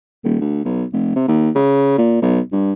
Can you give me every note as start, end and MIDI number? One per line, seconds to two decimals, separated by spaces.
0.24 0.38 27
0.41 0.61 38
0.65 0.84 35
0.93 1.13 29
1.16 1.23 48
1.28 1.50 39
1.56 1.94 49
1.98 2.21 46
2.22 2.40 35
2.52 2.73 43